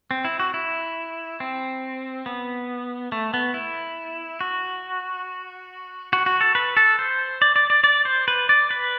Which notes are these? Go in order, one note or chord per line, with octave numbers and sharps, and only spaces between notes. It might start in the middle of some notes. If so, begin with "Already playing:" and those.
C4
E4
F#4
E4
C4
B3
A3
B3
E4
F#4
F#4
F#4
A4
B4
A4
C5
D5
D5
D5
D5
C5
B4
D5
B4